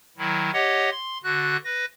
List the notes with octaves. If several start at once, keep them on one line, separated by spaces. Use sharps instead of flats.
D#3 F#3 E4
G4 C#5 D#5 F#5
C6
D3 F#4 F#6
B4 A#6